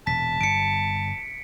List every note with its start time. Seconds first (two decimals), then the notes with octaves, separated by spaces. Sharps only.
0.07 E1 A#2 A5 B6
0.41 G1 G3 C#7 D7